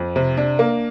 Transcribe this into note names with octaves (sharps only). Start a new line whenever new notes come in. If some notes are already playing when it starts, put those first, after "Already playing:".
Already playing: F2
C3
D4
A#3